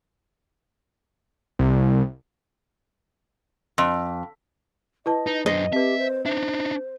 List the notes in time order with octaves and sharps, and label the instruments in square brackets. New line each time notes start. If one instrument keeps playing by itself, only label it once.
[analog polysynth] C2
[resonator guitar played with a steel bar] F2
[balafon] E4 B4 A5 [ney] D#5
[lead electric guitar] D#4 [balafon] B4
[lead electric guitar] F#2 C5 [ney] D4 [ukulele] D#5
[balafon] C4 B4 [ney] G4 [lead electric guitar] E5
[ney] C5
[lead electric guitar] D4 D#4 [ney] C5 [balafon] E5